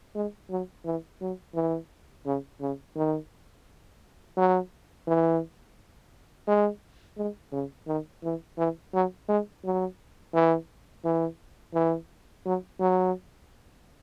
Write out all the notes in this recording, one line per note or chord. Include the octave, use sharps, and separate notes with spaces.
G#3
F#3
E3
F#3
E3
C#3
C#3
D#3
F#3
E3
G#3
G#3
C#3
D#3
E3
E3
F#3
G#3
F#3
E3
E3
E3
F#3
F#3